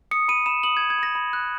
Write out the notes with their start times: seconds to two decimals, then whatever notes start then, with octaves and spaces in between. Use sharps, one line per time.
0.11 D#6 C#7
0.28 B5 D#7
0.46 B5 E7
0.63 D#6 F#7
0.77 G#6
0.81 B5
0.90 G#6
0.98 B5 A#6
1.15 B5
1.33 F#6